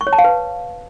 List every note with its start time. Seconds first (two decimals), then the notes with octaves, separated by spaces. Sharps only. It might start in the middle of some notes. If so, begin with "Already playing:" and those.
0.01 C#6
0.07 C#5
0.13 A5
0.19 F5
0.24 B4